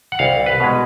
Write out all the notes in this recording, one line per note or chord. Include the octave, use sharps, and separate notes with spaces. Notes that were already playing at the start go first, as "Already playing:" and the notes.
F#5
C2 F5
B4
B2 G#3